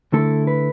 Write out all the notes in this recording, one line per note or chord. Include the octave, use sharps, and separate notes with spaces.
D2 D3 A3 E4 A4
B4